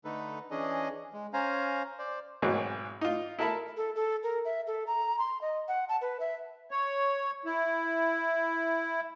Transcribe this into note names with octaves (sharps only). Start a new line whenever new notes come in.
D3 A3 D#4 A4 B4
E3 C#4 D4 G#4 D#5
G#3
C#4 C5 F5 G#5 A#5
C5 D5
G#1 B2 E3 F#3 C4 G#4
D#4 F4
E4 A4 A#4 E5 A5 B5
A4
A4
A#4
E5
A4
A#5
C6
D#5
F#5
A5
B4
E5
C#5
E4